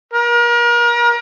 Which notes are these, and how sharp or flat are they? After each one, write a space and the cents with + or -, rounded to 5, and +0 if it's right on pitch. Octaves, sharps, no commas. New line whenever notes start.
A#4 +35